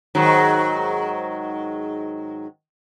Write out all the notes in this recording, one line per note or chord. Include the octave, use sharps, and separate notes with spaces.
G#2 D#3 F#3